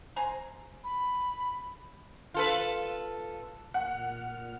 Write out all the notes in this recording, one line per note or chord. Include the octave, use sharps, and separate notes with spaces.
C5 G#5 A#5
B5
F4 A4 B4
A#2 F#5 F6